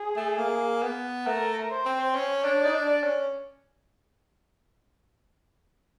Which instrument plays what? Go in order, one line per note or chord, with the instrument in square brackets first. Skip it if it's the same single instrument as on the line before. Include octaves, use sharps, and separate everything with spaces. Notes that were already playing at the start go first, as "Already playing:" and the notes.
Already playing: [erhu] G#4
[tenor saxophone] A3
A#3
B3
[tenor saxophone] A3 [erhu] A#4
[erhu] C5
[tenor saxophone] C4
[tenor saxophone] C#4 [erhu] C#5
[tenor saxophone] D4
[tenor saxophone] D#4 [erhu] D5
[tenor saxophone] D4
C#4